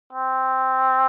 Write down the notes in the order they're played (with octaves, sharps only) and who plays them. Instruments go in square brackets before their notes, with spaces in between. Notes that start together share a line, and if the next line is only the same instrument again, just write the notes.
[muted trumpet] C4